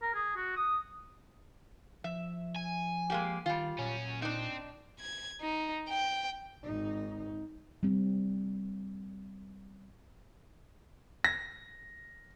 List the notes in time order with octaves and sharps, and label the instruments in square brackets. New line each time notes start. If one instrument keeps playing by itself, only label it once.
[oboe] A#4
G#4
F#4
D#6
[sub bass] F3 [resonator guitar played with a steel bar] E5
[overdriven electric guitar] G#5
[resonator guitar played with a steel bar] G#3 A#3 G4
[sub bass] D#3 [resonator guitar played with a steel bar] G3 F4
[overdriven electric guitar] F#2 C#4 [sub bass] A#2
[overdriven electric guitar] C4 [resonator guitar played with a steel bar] D4 D#4
[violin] G#6
D#4
G5
[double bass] G#1 D#4
[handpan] G3 C4
[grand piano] A#6